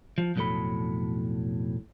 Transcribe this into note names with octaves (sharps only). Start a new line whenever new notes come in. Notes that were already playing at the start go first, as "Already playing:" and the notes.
F3
B1 F2 A2 F#3 A4 B5